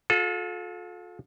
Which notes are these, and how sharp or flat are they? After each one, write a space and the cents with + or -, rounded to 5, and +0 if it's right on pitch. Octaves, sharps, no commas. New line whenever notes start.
F4 +35 A4 -25